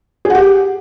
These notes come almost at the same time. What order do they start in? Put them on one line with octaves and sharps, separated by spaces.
G#4 F#5 G4